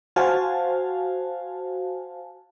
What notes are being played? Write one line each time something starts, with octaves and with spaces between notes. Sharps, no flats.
F#4 C5 F5 G#5 A5